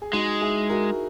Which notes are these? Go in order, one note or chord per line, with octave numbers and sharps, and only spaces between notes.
G#4
G#3 D#4 F#4
E4 G#4
F#4 A#4